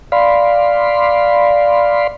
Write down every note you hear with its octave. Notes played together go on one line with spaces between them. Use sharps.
D5 F5 B5 C6